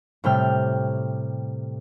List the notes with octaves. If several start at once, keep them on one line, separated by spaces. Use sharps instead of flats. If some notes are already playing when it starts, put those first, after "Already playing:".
A2 C3 G3 G5 F6